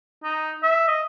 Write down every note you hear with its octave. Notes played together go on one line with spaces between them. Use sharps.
D#4
E5
D#5